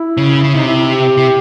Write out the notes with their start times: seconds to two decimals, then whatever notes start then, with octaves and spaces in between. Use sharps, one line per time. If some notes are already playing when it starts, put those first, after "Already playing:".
Already playing: E4
0.17 C#3
0.44 C#3
0.54 C3 D#4
0.66 E4
0.79 E4
0.91 G4
1.17 C3